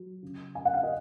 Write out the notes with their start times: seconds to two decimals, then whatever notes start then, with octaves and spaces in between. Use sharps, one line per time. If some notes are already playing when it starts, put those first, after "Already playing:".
Already playing: F#3
0.23 C#3
0.55 C#3 G#5
0.65 F#5
0.74 F5
0.83 D#5